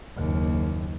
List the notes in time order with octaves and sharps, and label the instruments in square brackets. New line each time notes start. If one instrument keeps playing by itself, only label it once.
[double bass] F#1 D#2